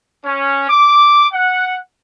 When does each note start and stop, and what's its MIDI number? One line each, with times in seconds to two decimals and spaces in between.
0.24 0.66 61
0.68 1.25 86
1.32 1.75 78